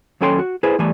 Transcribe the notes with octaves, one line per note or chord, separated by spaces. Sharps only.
D#2 F#3 C#4 A4 G5 C6
F#4
E4 G#4 B4 C5
E2 E3 G3 A3 G#5